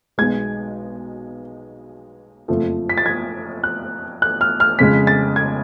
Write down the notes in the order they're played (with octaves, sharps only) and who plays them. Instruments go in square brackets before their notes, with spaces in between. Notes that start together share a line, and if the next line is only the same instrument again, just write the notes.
[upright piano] B1 B2 G#3 G#6
F#1 F2 F3 A3
B6
A6
G#6
F#6
F#6
F6
F6
F2 C#3 G#3 B6
A6
G#6